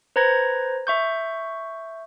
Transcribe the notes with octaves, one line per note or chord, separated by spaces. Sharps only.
B4 C5 A#5 G#6 A#6
E5 C#6 G6